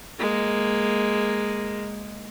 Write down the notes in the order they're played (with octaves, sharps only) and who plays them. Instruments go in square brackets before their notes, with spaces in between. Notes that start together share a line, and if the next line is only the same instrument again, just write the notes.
[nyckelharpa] G#3 A#3